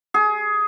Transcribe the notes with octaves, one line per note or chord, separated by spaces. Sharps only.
G#4